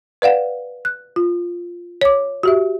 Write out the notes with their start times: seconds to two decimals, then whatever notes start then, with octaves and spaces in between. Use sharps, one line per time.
0.22 B4 D5 F5 F#5
0.85 F#6
1.16 F4
2.01 C#5 D6
2.43 F#4 G4 E5